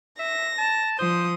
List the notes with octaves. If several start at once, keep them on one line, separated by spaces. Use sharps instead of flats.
E5 A#6
A5
F3 C5 D#6